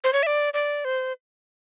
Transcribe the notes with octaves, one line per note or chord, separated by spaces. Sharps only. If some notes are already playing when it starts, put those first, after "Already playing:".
C5
C#5
E5
D5
D5
C5